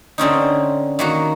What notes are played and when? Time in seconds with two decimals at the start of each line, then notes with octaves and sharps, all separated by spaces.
0.18 D3 C4 C#4 D#4
0.99 D#3 A#3 F#4